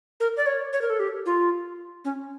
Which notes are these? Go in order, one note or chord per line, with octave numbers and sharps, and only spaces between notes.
A#4
D5
C#5
C#5
A#4
A4
G4
F4
C#4